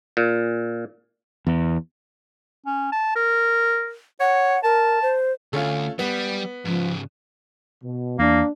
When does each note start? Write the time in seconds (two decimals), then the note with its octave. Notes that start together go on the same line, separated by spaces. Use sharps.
0.17 A#2
1.47 E2
2.66 C#4
2.92 A5
3.16 A#4
4.20 C#5 F#5
4.64 A#4 A5
5.02 C5
5.53 D2 A3 C#4 F4
5.99 G3 B3
6.65 G#2 C#3 F3
7.83 B2
8.19 E2 A#3 D4